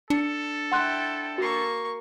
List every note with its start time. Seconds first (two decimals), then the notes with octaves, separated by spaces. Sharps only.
0.10 D4 A4 C#7
0.72 E4 F#5 G5 C6 F#6
1.38 A#3 F#4 C#6 C7